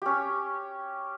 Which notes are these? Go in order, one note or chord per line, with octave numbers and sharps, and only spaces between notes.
C#4 G4